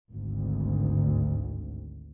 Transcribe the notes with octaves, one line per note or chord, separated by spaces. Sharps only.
G#1 D2